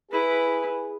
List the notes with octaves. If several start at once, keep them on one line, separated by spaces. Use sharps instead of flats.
E4 G#4 B4